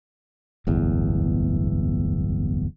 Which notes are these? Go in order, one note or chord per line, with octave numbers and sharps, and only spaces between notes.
D1 G1 E2